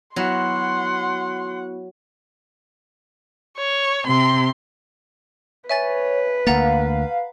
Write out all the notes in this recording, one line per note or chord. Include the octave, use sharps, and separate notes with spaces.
F#3 B3 E4 F#4 F#5 C6
C#5
C3 C6
B4 C#5 E5 G#5 A6
D2 A#3 F5 F#5 A#5 A6